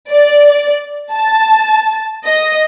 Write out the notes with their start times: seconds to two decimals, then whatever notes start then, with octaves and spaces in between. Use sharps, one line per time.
0.11 D5
1.12 A5
2.26 D#5